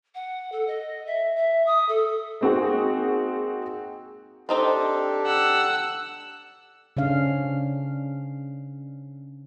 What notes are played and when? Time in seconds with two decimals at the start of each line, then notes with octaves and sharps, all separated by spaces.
0.14 F#5
0.52 A4
0.67 D#5
1.06 E5
1.36 E5
1.66 D#6
1.88 A4
2.41 G#3 A#3 C4 D#4 F#4 G#4
4.49 C4 D4 D#4 G4 A4 C5
5.26 F#5 E6
6.97 C#3 C#4 D4 F5